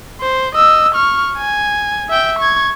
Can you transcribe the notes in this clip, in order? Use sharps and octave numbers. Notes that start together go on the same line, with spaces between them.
C5
D#5 E6
C#6 F6
G#5
E5 G5
C#6 G#6